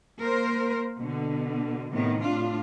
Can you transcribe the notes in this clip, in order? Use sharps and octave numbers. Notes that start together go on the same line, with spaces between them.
A#3 A#4 C5
B2 D3
A2 C3 D#3 B3
A2 D4 F4